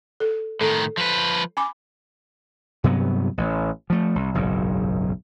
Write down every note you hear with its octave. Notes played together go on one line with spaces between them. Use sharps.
A4
A2 D#3 A4
F3 B4
G#5 B5 D6
G2 C3 F#3 B3
A1
F3 A3
C2
F#1 B1 G#2